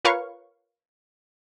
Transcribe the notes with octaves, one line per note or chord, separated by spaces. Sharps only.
F4 A#4 B4 C#5 F5 C#6